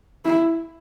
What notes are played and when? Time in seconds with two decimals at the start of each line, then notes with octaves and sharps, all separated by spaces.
0.25 E4